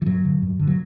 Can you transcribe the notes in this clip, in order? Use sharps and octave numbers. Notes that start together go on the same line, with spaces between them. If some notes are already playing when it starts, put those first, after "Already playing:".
E3
G2 F#3
D3
G2
D3
F#3